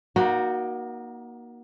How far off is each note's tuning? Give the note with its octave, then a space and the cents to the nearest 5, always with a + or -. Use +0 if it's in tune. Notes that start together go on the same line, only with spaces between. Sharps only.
A#3 +30 D#4 +0 F#4 +0